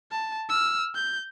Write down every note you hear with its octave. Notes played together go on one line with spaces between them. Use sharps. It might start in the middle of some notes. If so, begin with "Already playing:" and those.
A5
E6 F6
G6